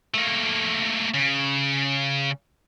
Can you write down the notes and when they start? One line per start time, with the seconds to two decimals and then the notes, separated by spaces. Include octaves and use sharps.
0.14 A3 A#3
1.14 C#3